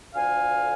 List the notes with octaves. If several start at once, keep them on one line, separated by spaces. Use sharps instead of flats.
D2 D3 F3 F5 G#5